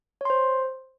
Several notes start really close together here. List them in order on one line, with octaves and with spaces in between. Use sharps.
C#5 C6 C5